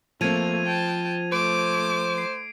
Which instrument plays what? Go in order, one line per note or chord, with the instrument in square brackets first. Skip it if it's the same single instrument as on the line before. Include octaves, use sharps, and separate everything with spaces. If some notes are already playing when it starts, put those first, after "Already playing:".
[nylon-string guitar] F3 C4 [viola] A3 A#3 [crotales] G#6 D#7 F7
[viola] G5 A5
[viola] A3 D6 [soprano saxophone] C5 [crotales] D7
[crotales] C7